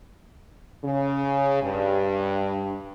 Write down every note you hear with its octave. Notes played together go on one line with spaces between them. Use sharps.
C#3
G2